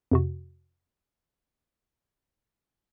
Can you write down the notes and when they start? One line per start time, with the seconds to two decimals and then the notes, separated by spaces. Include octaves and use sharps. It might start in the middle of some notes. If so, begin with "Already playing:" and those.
0.12 F2 C3 F#4